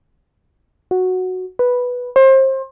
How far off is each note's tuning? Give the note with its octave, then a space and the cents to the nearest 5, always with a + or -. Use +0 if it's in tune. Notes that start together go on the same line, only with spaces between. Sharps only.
F#4 -5
B4 -5
C5 +30